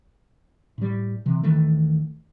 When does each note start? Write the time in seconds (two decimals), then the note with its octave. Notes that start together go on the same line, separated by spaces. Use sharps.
0.78 A2 G3
1.26 C3 E3
1.43 D#1 D#3 E3 A3